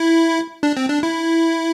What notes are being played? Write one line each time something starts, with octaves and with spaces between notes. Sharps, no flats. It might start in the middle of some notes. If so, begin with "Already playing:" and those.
Already playing: E4
D4
C4
D4
E4